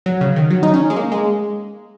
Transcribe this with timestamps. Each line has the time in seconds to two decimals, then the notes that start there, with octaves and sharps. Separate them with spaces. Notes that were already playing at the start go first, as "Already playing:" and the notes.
0.06 F#3
0.21 C#3
0.36 D#3
0.50 F#3
0.63 D#4
0.74 C#4
0.90 G#3
0.96 A#3
1.12 G#3